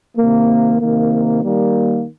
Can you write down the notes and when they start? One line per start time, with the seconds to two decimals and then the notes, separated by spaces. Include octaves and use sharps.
0.17 C3 D#3 A#3
0.80 C3 D#3 A#3
1.43 D#3 G3 A#3